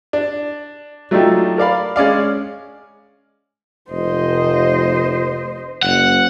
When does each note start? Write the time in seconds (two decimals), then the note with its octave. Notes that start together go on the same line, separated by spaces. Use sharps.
0.13 D4
1.11 F#3 A3 D4 D#4 F4 G4
1.58 A#4 D5 F5 B5
1.96 G#3 C#4 D5 F5
3.91 F1 C5 D#5
5.83 F#1 F#5